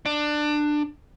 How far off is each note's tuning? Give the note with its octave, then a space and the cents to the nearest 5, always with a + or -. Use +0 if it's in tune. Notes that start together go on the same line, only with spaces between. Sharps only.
D4 +20